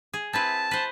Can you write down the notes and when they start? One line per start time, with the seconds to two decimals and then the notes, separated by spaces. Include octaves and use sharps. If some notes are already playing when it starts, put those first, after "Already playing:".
0.13 G#4
0.33 C4 E4 B4 A5
0.71 B4 C5